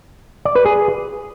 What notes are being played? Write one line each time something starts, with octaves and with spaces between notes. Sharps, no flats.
D5
B4
G#4